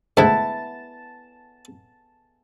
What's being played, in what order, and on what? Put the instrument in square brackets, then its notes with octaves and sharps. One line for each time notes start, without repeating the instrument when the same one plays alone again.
[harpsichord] D2 G#2 [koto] B3 E4 [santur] A5